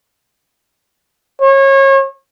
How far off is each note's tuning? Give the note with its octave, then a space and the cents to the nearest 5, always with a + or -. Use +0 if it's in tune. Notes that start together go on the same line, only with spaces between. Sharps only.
C#5 -30